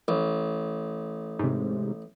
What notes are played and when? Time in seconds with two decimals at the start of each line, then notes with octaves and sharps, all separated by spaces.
0.08 A1
1.39 G#2 C3